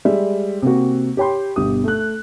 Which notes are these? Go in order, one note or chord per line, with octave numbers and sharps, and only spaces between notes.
G3 G#3 E5
C3 A#3 F#4
G4 C#5 G5 B5 C6
G1 B2 G4 D#6
A3 F#6